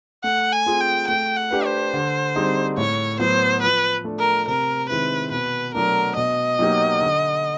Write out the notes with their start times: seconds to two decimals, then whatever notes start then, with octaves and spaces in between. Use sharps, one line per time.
0.24 A3 F#5
0.52 G#5
0.66 C4 F4 G#4
0.80 G5
1.08 A3 G5
1.37 F#5
1.51 D4 G4 B4
1.65 C5
1.93 D3
2.36 G3 C4 D#4 G#4
2.77 A2 C#5
3.19 F#3 B3 C5
3.62 F3 B4
4.04 A3 D4
4.19 A#4
4.47 C3 A#4
4.89 D#3 G#3 C4 E4 B4
5.31 B2 B4
5.74 F#3 A3 D4 A#4
6.16 B2 D#5
6.59 F#3 A#3 D#4 G4
7.01 D3